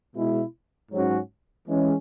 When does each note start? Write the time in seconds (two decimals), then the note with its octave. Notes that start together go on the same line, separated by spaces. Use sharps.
0.16 B2 G#3 E4
0.92 G#2 F#3 C#4 F#4
1.68 E3 G#3 C#4